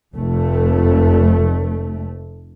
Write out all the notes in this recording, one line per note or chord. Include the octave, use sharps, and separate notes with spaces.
F1 F2 A3